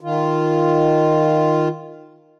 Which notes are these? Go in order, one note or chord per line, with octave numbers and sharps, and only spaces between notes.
D#3 F4